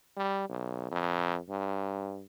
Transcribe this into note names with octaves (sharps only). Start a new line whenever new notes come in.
G3
B1
F2
G2